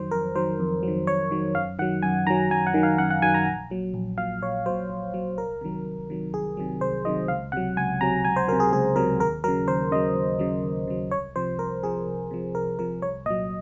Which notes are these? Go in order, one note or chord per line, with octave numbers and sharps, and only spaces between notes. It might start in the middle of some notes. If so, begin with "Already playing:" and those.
Already playing: F2 D#3 F#3 C5
F2 A#4
D#3 F#3 C5
F2
D#3 F#3
F2 C#5
D#3 F#3
F#2 F5
D#3 F#3 F#5
F#2 G#5
D#3 F#3 A#5
F#2 G#5
F#5
D#3 F#3
F5
F#2 F#5
F#5
D#3 F#3 G#5
A#5
A#1
A#2 F#3
A#1
A#2 F#3 F5
A#1 C#5
A#2 F#3 C5
A#1
A#2 F#3
C2 A#4
C3 D#3 F#3
C2
C3 D#3 F#3
C2 G#4
C3 D#3 F#3
C2 C5
C3 D#3 F#3 D#5
C#2 F5
C3 F#3 F#5
C#2 G#5
C3 F#3 A#5
C#2 G#5
C5
C3 F#3 A#4
G#4
C#2 G#4
C3 F#3 A#4
D#2 A#4
C#3 F#3 A#4
D#2 C5
C#3 F#3 D#5
D#2
C#3 F#3
D#2
C#3 F#3
C2 C#5
C3 F3 C5
C2 A#4
C3 F3 G#4
C2
C3 F3
C2 A#4
C3 F3 A#4
C2 C#5
A#2 F#3 D#5